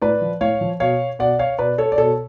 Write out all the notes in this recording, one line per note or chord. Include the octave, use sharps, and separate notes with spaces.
A2 B4 D5
F3
A2 C#5 F5
F3
B2 C#5 F5
B2 D5 F#5
C#5 F5
B2 B4 D5
A4 C#5
D5
B2 A4 C#5